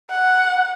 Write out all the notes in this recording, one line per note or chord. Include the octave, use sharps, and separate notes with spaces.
F#5